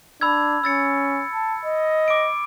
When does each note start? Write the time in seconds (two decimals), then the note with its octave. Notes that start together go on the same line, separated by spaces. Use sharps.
0.21 D4 B5 E6 G#6
0.64 C#4 E6 A6 C#7
1.33 A5
1.65 D#5
2.08 D6 D7